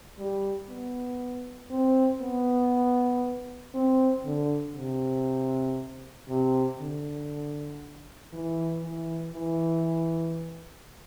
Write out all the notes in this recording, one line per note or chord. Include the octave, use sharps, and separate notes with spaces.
G3
B3
C4
B3
C4
D3
C3
C3
D3
E3
E3
E3